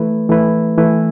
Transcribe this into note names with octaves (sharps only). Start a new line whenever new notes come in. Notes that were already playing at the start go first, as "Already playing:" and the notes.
Already playing: E3 A3 E4 B4
E3 A3 E4 B4
E3 A3 E4 B4